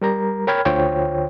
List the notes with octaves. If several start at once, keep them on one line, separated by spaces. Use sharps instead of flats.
G3 A#4 A#5
A#4 C#5 G5 B5 F6 G#6
D2 D3 F4 C5 C#5 G5